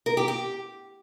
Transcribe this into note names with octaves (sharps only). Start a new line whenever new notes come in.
A#4
G4
G4